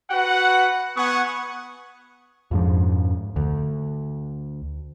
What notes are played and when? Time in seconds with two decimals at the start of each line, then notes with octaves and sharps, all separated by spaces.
0.11 F#4 B4 F#5
0.97 B3 F#5 G#5 C#6 D#6
2.51 F2 G#2 F3
3.36 D2